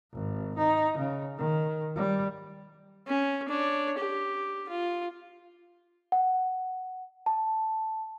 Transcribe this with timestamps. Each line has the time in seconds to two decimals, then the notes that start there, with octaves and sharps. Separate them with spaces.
0.12 G#1
0.57 D#4
0.98 C#3
1.38 D#3
1.96 G3
3.07 C#4
3.49 D4 C#5
3.98 G4
4.69 F4
6.12 F#5
7.26 A5